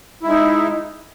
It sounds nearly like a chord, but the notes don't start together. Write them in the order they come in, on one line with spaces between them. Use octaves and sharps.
E4 G#3 D#4